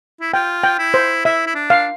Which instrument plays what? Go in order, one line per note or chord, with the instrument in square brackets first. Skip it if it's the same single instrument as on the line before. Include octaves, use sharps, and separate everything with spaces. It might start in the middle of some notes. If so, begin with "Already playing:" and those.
[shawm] E4
[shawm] F4 [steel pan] G5
[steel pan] G5
[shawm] E4
[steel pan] C5
[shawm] E4 [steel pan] E5
[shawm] E4
D4
[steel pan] F5